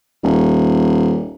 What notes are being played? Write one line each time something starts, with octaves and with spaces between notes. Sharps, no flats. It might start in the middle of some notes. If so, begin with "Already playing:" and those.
D#1